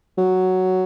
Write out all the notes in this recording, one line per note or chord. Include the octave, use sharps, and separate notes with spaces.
F#3